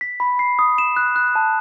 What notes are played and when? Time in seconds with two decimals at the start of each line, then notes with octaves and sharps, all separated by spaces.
0.01 B6
0.20 B5
0.39 C7
0.59 D#6
0.78 E7
0.97 F#6
1.16 F#6
1.35 A5